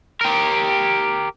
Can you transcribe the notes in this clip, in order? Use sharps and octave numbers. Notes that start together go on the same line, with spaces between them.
G4 A#4